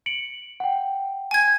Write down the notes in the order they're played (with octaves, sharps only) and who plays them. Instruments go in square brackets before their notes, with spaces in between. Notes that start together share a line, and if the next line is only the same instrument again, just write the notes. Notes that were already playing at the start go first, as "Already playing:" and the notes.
[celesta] C#7 D7 F#7
F#5 G5
[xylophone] G#5 G#6